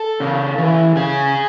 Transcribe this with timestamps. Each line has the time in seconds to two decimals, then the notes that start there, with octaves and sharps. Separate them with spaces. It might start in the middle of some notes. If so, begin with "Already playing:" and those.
Already playing: A4
0.20 C#3
0.58 E3
0.96 C#3 G#4